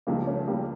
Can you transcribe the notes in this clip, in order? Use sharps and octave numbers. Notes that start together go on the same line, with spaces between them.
C#2 C#3 F3 G3 A#3
A3 C#4
G3 A#3